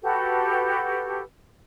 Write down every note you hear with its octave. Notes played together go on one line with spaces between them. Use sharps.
F#4 G4 A4 B4